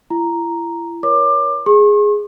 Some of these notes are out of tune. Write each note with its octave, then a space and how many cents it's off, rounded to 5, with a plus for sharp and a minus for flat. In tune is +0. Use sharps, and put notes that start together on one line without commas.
E4 +35 A#5 +0
A#4 +35 C#5 +20 D6 +20
G#4 +0 C#6 -45